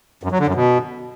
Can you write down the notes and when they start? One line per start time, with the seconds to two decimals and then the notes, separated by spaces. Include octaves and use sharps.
0.23 F#2
0.31 F#3
0.39 D3
0.47 F#2
0.55 B2